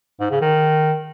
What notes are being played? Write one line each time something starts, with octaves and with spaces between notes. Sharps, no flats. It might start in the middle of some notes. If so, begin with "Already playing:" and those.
G#2
C#3
D#3